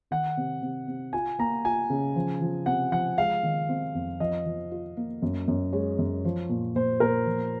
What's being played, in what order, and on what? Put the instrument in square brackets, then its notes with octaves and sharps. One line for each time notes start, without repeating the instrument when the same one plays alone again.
[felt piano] D#3 [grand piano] F#5
[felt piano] C3
C3
C3
[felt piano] F4 [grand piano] G#5
[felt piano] A#3 [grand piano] A#5
[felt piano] F4 [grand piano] G#5
[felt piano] C#3
F3
F3
[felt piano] C3 [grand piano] F#5
[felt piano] F3 [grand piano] F#5
[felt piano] G#3 [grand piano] F5
[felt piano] D#3
C4
F2
[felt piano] F3 [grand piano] D#5
[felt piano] F3
F4
A#3
F#2
F#2
[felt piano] G#3 [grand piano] C#5
[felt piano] F#2
F3
A#2
[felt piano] A#2 [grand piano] C5
[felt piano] A#2 [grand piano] A#4
[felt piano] F3